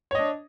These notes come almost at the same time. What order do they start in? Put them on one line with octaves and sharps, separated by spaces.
C#5 D#5 D4